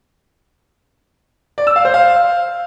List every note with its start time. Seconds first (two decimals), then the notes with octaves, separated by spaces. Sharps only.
1.58 D5
1.67 E6
1.76 F5
1.85 C5
1.94 F5